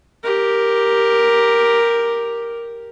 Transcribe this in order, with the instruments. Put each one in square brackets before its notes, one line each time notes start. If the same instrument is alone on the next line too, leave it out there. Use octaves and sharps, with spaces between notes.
[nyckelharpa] G4 A#4